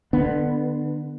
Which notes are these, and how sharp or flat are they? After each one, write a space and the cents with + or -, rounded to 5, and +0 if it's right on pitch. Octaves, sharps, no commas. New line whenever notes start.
D3 +30 B3 +0 D4 +0